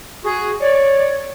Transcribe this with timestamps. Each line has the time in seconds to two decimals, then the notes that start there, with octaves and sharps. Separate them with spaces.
0.25 F#4 G#4
0.61 C#5 D5